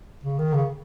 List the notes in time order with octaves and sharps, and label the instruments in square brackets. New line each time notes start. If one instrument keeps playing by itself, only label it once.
[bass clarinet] C#3
D#3
C#3